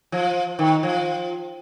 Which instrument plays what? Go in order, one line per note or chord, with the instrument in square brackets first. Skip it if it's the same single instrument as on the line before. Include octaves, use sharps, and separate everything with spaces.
[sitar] F3
D#3
F3